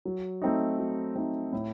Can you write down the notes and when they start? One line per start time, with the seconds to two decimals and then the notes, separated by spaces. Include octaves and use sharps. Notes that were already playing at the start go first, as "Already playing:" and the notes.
0.05 F#3
0.42 A3 C4 D#4
0.79 F#3
1.16 A3 C4 D#4
1.52 A2